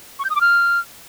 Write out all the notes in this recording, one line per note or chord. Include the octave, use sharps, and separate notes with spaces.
C#6
G6
D#6
D6
F6